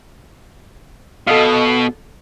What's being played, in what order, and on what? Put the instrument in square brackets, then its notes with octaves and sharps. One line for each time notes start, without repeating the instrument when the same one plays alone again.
[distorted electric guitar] B2 [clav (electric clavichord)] A4 D#5 F5